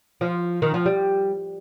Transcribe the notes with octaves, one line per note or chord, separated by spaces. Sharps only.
F3
D#3
F3
G3